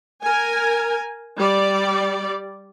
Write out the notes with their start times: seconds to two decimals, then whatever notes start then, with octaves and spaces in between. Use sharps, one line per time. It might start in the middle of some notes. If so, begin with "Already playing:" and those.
0.22 A#4 G#5
1.37 G3 D5